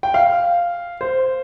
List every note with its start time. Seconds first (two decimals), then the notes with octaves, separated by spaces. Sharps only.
0.03 G5
0.14 F5
1.01 C5